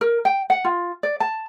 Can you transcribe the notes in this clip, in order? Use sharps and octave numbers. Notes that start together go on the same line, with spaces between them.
A#4
G5
F#5
F4
D5
A5